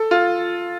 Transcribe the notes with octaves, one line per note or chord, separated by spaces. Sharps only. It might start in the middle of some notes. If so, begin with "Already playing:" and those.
Already playing: A4
F4